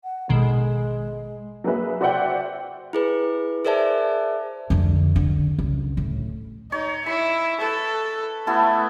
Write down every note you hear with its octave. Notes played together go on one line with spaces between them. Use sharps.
F#5
A1 B2 D#3 G#3
F#3 A#3 G#4 B4 E5
F#4 C5 D5 E5 F#5 G5
E4 G#4 B4
G#4 A#4 C5 D5 E5 A5
F2 D3
D3
C#2
A2
D#4 C#5
E4 B5
A4 B4
A3 B3 E4 A4